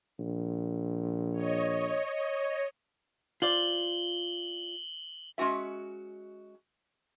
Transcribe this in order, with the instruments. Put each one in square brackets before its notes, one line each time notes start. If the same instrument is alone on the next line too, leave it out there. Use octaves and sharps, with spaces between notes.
[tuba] A#1
[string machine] C#5 D#5
[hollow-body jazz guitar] F4 C5 D5 [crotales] F#7 G7
[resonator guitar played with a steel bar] G#3 C#4 F#4 E5